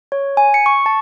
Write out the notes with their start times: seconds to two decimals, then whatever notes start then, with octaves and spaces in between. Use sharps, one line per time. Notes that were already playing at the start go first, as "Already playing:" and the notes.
0.12 C#5
0.37 G#5
0.54 C#7
0.66 C#6
0.86 A5